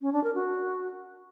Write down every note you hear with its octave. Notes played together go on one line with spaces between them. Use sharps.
C#4
D4
A#4
F#4